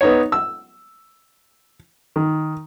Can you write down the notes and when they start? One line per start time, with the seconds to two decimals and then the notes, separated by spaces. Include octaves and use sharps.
0.01 B3 D#4 C#5
0.32 E6
2.16 D#3